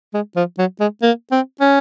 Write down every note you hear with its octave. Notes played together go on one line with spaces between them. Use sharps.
G#3
F3
F#3
G#3
A#3
C4
C#4